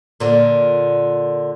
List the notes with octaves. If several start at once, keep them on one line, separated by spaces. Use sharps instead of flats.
A#2 D3